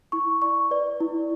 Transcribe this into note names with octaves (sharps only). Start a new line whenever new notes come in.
E4 C#6
D5 C#6
B4 D5
E4